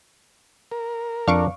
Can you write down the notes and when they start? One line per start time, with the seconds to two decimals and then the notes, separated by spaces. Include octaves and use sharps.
0.72 A#4
1.28 F2 D4 F5 C#6 D6